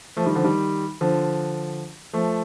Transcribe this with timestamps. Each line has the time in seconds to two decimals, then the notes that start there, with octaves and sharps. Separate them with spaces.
0.17 F3 A3
0.26 D#3 G3
0.35 D3 F3
0.44 D#3 G3
1.01 D3 F3
2.13 F3 A3